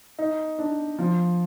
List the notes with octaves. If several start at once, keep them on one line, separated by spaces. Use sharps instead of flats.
D#4
D4
F3